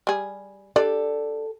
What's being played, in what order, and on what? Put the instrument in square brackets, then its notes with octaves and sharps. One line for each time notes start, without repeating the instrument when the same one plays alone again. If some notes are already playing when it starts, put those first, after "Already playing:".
[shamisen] G3 G#4
[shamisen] D4 D5 [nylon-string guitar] G4 A4